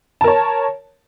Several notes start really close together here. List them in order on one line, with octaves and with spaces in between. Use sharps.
A5 A#4 C#5